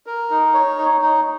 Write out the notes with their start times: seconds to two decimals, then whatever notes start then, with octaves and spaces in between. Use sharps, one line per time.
0.06 A#4
0.30 D#4
0.54 C#5
0.77 D#4
1.01 D#4